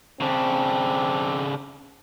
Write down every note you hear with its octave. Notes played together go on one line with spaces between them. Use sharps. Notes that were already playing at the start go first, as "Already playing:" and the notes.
C#3 C4 D4